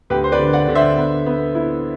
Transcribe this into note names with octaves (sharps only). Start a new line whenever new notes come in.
D2 G4 B4
C5
B4 D5
D3
D5 F#5
D3
C5 E5
B3
B3
E4